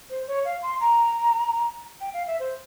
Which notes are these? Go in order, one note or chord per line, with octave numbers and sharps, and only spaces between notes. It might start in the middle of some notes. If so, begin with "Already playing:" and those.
C5
C#5
F5
C6
A#5
G5
F5
E5
C5